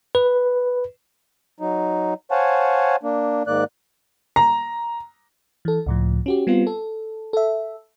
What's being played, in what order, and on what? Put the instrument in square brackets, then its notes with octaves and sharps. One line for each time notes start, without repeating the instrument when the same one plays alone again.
[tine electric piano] B4
[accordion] F#3 D#4
C5 C#5 F5 F#5 G#5 A5
A#3 D4
G#2 D#3 A#3 D5 F#6
[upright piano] A#5
[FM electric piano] E3 A4
C#2 A2 F3
C#4 F#4 G4
G3 B3 C4 F4
A4
A4 E5